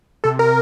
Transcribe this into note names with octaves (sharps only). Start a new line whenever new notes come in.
C3 A4
A#4